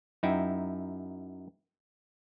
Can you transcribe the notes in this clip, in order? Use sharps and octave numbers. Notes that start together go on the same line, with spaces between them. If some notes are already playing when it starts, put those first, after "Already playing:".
F#2 D#4 E4 G5